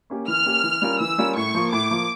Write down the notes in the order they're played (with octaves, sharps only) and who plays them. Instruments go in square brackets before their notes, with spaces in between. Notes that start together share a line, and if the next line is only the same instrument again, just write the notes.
[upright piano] A#3 C#4 G4
[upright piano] E3 [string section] F6
[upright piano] A#3 C#4 G4
E3
G3 C#4 F4 A#4
[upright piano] E3 [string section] E6
[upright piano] G3 C#4 F4 A#4
[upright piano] A2 [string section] C#6
[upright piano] F3 A#3
[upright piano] A2 [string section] D6
[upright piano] F3 A#3